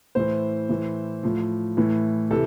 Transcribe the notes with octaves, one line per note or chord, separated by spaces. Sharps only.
A2 E3 C5
A2 E3
A2 F3
A2 E3
C3 E3 A4